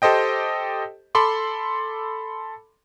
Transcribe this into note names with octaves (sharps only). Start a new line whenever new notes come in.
G4 A4 C5 D#5 G5
A4 B5 C6 D6